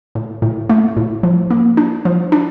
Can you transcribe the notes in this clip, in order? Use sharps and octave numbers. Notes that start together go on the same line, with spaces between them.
A2
A2
A3
A2
F3
A#3
D4
F3
D4